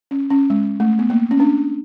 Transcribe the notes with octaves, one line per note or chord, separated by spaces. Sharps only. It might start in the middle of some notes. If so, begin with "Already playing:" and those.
C#4
C#4
G#3
A3
B3
A#3
C#4
D4